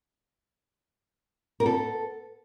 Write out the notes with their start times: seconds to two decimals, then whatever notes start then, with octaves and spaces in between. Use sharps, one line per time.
1.60 A#4
1.63 B3
1.66 A4